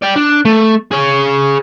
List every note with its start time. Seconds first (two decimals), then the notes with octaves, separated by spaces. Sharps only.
0.02 D5 G5
0.16 D4
0.45 A3
0.91 G#4 C#5